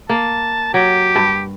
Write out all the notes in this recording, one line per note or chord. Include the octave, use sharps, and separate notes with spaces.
A#3 A5
F#3 G4
G2